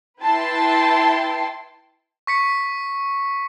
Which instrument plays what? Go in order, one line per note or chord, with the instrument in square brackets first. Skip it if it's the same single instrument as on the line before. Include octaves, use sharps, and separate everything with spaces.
[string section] E4 B4 G5 A5 C6
[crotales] C#6 B6 C#7